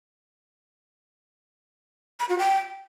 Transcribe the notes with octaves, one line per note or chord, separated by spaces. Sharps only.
B5
F#4
G5